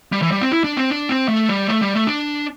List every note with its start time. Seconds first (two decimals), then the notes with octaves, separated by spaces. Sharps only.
0.12 G3
0.22 E3
0.31 G3
0.41 C4
0.52 E4
0.64 D4
0.77 C4
0.90 D4
1.09 C4
1.28 A3
1.49 G3
1.67 A3
1.81 G3
1.94 A3
2.07 D4